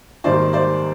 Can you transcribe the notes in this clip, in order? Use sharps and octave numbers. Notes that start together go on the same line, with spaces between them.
G#1 G#2 D#3 G3 A#3 C5 D5
C5 D5